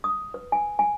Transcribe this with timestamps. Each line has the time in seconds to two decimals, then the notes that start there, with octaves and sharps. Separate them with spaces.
0.04 D#6
0.34 B4
0.52 G#5
0.79 G#5